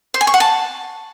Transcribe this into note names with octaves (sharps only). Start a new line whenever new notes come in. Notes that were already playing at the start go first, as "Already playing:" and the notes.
C5
G#5
C#6
F#5
A5